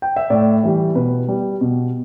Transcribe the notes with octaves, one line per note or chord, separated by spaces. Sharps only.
G5
E5
A2 D5
E3 G3
B2 B4
G3
B2